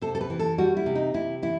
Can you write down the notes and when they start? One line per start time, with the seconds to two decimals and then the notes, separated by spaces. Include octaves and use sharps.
0.02 C3 A4
0.15 A4
0.21 B4
0.30 E3
0.39 A4
0.58 G3 F#4
0.77 E4
0.86 C3
0.95 D#4
1.14 C3 E4
1.42 E3 E4